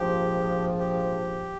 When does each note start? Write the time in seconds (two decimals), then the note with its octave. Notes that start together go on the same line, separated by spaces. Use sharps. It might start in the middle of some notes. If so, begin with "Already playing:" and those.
Already playing: A#1 G#2 F3 G4
0.79 G4